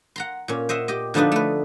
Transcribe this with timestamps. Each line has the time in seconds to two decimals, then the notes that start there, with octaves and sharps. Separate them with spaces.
0.16 F#5 A#5 C6
0.48 A#2 C#4
0.69 C5 D#5 E5 F#5
0.88 G4 D#5
1.14 D3 F3 B3 D4 D#4 B4
1.32 A3 B4